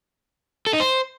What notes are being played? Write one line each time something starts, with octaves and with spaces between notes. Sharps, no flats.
A4
D#4
C5